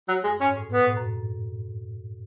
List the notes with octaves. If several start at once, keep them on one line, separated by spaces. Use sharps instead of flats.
F#3
F#2 G#3
G#2 C#4
A2
B2 B3
A2
F#2